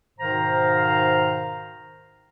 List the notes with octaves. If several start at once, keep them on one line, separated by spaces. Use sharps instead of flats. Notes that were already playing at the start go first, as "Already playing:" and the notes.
G#2 B2 D#3 C5 F5 A#5